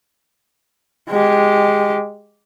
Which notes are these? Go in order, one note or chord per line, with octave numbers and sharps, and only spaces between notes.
G#3 G4